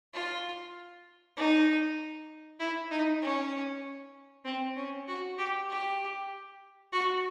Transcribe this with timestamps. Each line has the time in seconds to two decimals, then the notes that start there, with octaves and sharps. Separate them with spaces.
0.13 F4
1.37 D#4
2.60 E4
2.91 D#4
3.22 C#4
4.45 C4
4.76 C#4
5.08 F#4
5.38 G4
5.69 G4
6.92 F#4